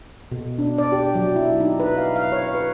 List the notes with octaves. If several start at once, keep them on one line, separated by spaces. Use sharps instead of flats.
B2
D4
D5
G4
F#3
E4
D#4
B4
F5
F5
C#5
B4